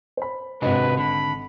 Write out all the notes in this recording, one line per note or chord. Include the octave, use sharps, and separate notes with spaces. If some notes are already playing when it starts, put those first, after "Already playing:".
C5 B5
G#1 C3 D4 F#4 B4 D#5
D3 B5